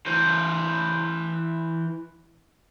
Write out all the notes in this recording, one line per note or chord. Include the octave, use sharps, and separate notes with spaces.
E3 C5